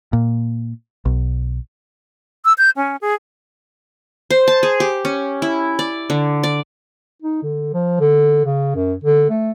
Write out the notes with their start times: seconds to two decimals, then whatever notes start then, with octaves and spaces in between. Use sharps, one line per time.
0.13 A#2
1.05 B1
2.45 E6
2.58 G6
2.76 C#4
3.01 G#4
4.30 C5
4.48 A5
4.63 G#4
4.80 G4
5.05 C#4
5.42 E4
5.79 D5
6.10 D3
6.43 D5
7.22 D#4
7.43 D3
7.73 F3
8.00 D3
8.45 C#3
8.75 F#2
9.04 D3
9.30 A3